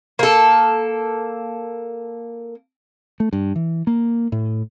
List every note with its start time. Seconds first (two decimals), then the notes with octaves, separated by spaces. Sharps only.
0.19 A#3 A4
3.20 A3
3.33 G2
3.56 E3
3.87 A#3
4.32 A2